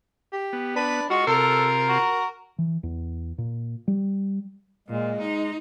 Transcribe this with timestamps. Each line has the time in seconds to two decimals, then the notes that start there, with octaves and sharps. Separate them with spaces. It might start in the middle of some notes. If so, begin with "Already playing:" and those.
0.33 G4
0.53 B3
0.76 D4 B4
1.10 G#3 F4 F#4
1.27 C3 F4 A4 A#4 C6
1.89 F#4
2.58 E3
2.83 E2
3.38 A#2
3.88 G3
4.88 A#2 G#3
5.20 D#4